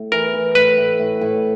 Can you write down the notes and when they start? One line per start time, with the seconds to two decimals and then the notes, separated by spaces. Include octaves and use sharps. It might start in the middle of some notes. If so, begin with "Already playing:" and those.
Already playing: A2
0.12 E3 A#4
0.34 E3
0.55 A2 B4
0.78 A2
0.99 A2
1.21 A2